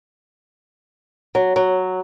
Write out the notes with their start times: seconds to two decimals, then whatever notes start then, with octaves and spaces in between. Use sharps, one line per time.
1.35 F#3
1.56 F#3